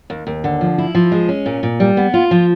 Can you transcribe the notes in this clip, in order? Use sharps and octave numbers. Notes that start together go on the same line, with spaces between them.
D#2
D#2
D3
F3
E4
F3
G#3
C#4
A#2
A#2
G3
B3
F4
F3